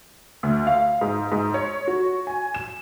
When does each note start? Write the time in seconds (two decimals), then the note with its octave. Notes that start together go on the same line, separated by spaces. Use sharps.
0.43 D2
0.67 F5
1.01 G#2
1.32 G#2
1.54 C#5
1.88 F#4
2.27 G#5
2.54 E7